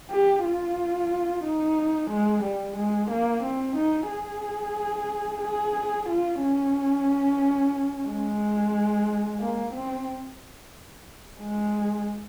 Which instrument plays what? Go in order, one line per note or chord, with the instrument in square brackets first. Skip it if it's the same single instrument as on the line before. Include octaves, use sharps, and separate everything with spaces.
[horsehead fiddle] G4
F4
D#4
G#3
G3
G#3
A#3
C4
D#4
G#4
G#4
F4
C#4
G#3
A#3
C4
G#3